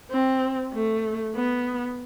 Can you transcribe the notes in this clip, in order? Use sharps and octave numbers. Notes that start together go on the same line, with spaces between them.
C4
A3
B3